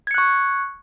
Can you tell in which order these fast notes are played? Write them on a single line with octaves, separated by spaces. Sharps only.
G#6 C#7 F#6 C#6